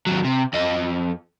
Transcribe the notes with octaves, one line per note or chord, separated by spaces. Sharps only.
D#2 F#3
C3
F2 D#5